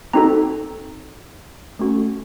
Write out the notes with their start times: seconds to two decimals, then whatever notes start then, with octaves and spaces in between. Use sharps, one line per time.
0.13 C4 D#4 F#4 A4 A#5
1.79 A3 C#4 F#4 A4